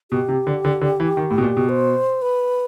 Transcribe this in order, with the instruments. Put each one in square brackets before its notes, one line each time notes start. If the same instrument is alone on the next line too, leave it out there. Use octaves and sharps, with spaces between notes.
[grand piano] B2 [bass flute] G4
[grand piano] C3
D3
D3
D3
E3
D#3
A2
B2
A#2
B2
[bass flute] C5
B4